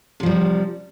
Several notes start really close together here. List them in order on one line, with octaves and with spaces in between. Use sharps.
C3 F3 G3